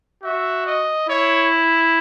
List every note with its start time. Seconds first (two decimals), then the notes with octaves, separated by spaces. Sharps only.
0.23 F#4 E5
0.66 D#5
1.09 E4 C#5